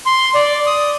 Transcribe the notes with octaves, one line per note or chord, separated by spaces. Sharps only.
C6
D5
D#6